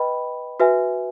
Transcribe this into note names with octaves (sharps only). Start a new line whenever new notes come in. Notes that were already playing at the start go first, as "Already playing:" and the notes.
Already playing: B4 D#5 G5 B5
F#4 B4 E5 G#5